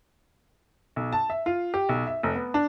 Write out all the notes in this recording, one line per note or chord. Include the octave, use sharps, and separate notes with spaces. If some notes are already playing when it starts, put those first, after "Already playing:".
B1
A5
E5
F4
G4
B1
E5
F1
B3
D4